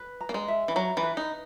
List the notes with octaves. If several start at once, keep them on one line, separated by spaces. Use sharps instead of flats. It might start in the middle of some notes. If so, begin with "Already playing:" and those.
Already playing: B4
A#5
A#3
G#3
E5
E3
F#3 A#5
E3
B4
D#4